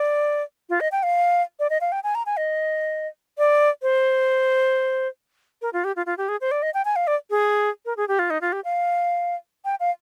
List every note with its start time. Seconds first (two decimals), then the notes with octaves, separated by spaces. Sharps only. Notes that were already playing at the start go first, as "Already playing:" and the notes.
Already playing: D5
0.70 F4
0.80 D#5
0.92 G5
1.03 F5
1.60 D5
1.70 D#5
1.81 F5
1.92 G5
2.04 G#5
2.15 A#5
2.26 G#5
2.37 D#5
3.38 D5
3.82 C5
5.62 A#4
5.73 F4
5.84 G4
5.96 F4
6.06 F4
6.18 G4
6.29 G#4
6.41 C5
6.51 D5
6.62 D#5
6.74 G5
6.85 G#5
6.96 F5
7.07 D5
7.30 G#4
7.86 A#4
7.97 G#4
8.08 G4
8.19 F4
8.30 D#4
8.41 F4
8.52 G4
8.64 F5
9.65 G5
9.80 F5